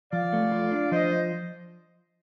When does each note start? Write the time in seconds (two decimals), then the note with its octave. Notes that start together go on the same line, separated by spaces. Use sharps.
0.12 F3 D5 F5
0.33 A3
0.52 F4
0.72 D4
0.92 F3 C5 D#5